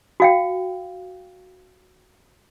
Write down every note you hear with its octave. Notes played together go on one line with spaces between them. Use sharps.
F#4 F5 G5